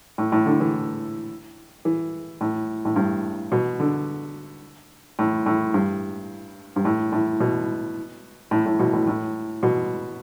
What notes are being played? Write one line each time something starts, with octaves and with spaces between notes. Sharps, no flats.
A2
A2
D3
E3
E3
A2
A2
G2
B2
D3
A2
A2
G2
G2
A2
A2
B2
A2
A2
B2
A2
A2
B2